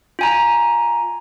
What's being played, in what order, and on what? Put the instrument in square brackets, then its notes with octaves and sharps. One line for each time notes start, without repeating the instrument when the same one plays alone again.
[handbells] F4 G#5 A#5